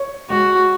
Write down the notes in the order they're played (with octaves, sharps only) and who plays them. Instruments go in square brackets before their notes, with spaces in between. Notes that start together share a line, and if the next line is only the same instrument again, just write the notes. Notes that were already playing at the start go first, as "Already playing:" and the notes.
Already playing: [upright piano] C#5
[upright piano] G#3 [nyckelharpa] F#4